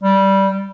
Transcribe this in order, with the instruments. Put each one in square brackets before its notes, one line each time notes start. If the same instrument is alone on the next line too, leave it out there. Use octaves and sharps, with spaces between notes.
[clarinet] G3